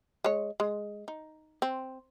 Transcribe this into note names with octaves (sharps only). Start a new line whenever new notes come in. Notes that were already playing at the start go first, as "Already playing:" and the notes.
G#3 C#5
G#3
D#4
C4